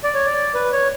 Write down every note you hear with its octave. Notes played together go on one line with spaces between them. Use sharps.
D5
C#5
D5
B4
C#5